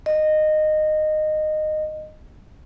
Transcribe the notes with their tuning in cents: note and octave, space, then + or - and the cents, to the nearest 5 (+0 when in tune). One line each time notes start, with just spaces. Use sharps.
D#5 -15